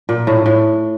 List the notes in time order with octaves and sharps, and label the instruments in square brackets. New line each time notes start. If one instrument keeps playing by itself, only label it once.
[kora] A#2
A2
A2